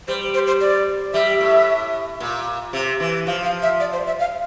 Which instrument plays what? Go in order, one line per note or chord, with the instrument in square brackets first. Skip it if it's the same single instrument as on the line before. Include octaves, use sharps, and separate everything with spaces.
[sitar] G3 [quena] C5
[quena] C5
C5
D5
[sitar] G3 [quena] E5
[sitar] A2
A#2
C3
E3
[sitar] F3 [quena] F5
[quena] F5
E5
D5
C5
E5
F5